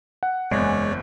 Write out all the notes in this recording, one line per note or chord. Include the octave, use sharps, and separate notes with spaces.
F#5
F#1 E2 G#3 C#5 D5